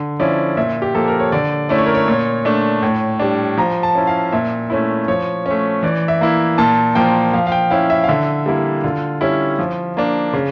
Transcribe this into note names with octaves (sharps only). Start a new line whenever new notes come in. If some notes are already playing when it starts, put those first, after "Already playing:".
Already playing: D3
F3 C#4 E4 D5
A#2 E5
G4
F3 A#3 A4
A#4
C#5
D3 D5
A3 C#4 E4 D5
C#5
A#4
C#5
A#2
A3 D4
A2
G3 D4
F3 A#5
A5
C#4 E4
F5
A#2 E5
A3 C#4 E4
F3 C#5
A3 C#4
E3 D5
E5
A#3 E4
A#2 A5
F3 A#3 G5
F3 F5
F5
G5
C#4 E4 F5
E5
F5
D3 E5
G3 A#3 E4
D3 F4
G3 C#4 E4
F3
A#3 D4
C#3